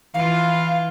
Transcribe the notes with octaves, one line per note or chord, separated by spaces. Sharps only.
E3 F4 F5